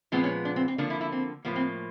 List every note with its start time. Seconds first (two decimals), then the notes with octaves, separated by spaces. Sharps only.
0.12 A#2 F3 G#3 B3 C4
0.24 C#4
0.45 D4
0.56 C4
0.68 C4
0.78 D3 F3 A#3 D4
0.90 E4
1.01 E4
1.12 C4
1.45 A2 F3 A#3 B3
1.56 C4